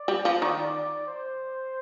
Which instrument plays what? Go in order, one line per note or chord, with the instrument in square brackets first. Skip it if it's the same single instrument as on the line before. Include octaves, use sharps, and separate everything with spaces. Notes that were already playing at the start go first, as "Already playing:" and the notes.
Already playing: [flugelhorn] D5
[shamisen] G3
F3
D#3
[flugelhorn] C5